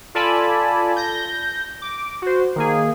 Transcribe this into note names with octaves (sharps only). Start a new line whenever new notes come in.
F4 A4 D5 G#5 A5 B5
G6 A#6
D6
F#4 C5
D#3 A#3 G#4